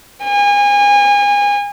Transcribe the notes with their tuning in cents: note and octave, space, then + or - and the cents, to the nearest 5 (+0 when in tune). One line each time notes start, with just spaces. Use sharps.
G#5 -30